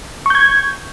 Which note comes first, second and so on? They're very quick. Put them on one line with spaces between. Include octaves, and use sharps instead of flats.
C#6 G6 G#6